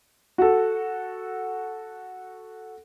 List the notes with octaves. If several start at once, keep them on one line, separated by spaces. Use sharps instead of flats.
F#4 A4